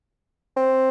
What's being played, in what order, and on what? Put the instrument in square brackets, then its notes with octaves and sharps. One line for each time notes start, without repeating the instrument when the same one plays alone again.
[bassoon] C4